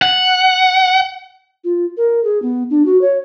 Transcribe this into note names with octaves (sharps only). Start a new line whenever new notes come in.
F#5
F4
A#4
G#4
B3
D4
F#4
C#5